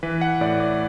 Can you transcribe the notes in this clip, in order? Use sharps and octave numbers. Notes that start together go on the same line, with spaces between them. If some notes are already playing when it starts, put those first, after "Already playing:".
E3 B4
F#5
A2 D5
D5